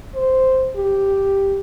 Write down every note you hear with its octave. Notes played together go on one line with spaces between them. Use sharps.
C5
G4